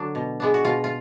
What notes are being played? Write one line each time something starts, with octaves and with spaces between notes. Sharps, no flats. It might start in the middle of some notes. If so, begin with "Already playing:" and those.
Already playing: D3 F#3 D4 F#4
B2
G#3 B3 D4
F#4
B2 F4
F4